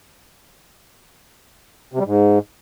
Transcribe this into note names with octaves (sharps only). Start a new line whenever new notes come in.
C3
G3
G#2